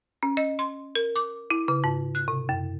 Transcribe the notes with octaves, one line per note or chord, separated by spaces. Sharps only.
C#4
D#5
C6
A#4
D6
E4
C#3
G#2
F#6
C3
F#2